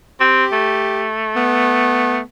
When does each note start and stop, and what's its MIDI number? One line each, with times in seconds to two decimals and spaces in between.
0.21 0.45 60
0.21 1.07 67
0.53 2.19 57
1.36 2.21 59